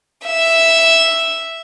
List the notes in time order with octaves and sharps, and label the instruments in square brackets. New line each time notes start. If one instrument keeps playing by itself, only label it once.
[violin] E5